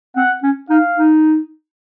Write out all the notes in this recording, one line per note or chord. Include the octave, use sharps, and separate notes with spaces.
C4 F#5
C#4
D#4 F5
D#4